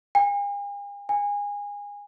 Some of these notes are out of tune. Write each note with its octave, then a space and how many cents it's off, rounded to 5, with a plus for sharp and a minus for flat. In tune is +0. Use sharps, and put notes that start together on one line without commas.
G#5 -45
G#5 -25